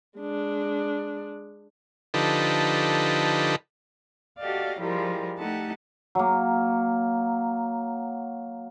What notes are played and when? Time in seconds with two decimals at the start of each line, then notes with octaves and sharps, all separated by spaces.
0.19 G#3 D4
2.14 D3 F3 D#4 G4 A4 B4
4.38 F#4 G4 A4 D5 D#5 F5
4.79 F3 G3 G#3 E4 G4 A#4
5.37 A3 D#4 G4 A4 F#5 A5
6.15 F#3 A#3